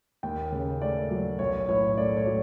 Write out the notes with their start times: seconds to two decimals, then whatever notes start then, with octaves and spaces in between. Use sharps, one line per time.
0.23 D#2 G5
0.52 C#3
0.81 A3 D5
1.11 F#3
1.39 B1 C#5
1.69 A2 C#5
1.97 A3 D5
2.17 C#5
2.26 F#3